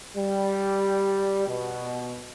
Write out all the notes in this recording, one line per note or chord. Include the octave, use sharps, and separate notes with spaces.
G3
B2